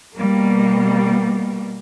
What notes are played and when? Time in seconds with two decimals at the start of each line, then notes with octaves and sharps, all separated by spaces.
0.16 B2 G3 A#3